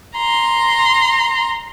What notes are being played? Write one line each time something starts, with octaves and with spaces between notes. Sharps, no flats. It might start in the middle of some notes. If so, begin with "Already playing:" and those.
A#5 C6